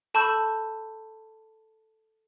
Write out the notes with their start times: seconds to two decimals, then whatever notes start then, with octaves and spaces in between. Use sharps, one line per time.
0.14 A4 A5 B5 C#6 E6 G6